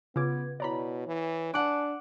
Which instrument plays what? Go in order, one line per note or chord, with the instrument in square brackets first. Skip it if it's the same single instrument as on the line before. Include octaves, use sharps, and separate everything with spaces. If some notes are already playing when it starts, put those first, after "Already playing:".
[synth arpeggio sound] C#3 F4 D6 [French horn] B3 [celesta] B4 G#6
[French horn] B2 [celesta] E4 C#5 [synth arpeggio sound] D5 A#5 B5
[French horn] E3
[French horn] D4 [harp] F#5 D6 [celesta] G#5 A5 F#6